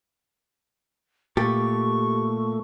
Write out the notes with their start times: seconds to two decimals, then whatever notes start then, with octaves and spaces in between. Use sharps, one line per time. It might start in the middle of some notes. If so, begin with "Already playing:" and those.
1.37 A#2 A3 G4 A4 C#6